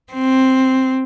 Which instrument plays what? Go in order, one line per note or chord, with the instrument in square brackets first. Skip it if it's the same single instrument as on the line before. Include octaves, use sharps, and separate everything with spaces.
[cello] C4